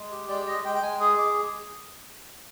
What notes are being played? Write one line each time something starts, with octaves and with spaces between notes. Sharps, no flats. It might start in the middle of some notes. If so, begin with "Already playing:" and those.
Already playing: G#3
G4
G#3 D5
G#3 D#5
G#3 G5
G5
G#3 G#5
G#4 D#6
D6